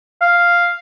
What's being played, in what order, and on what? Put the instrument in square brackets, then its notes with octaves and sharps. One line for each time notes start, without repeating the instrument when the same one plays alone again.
[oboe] F5